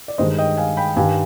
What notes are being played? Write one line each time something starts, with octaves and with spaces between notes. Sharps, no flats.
D5
G2 D#3 G#3 C5 D#5
D#5 G5
F5 G#5
G5 B5
G2 D#3 G3 F5 G#5